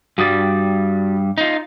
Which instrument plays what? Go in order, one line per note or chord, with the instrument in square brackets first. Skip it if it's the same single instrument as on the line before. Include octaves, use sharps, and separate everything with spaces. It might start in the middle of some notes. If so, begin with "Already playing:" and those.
[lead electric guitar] G2 G3 [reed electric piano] F#4 D#6 A6
[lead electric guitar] D#4 F4